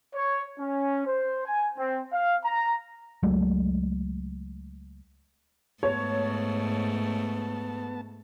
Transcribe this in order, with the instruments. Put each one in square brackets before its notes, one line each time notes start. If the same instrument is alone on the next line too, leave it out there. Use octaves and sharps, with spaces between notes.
[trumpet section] C#5
C#4
C5
G#5
C4
F5
A#5
[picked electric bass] C#2 F#3 G#3 A3
[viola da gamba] G#2 A3 [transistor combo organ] B3 A5 [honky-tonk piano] C#5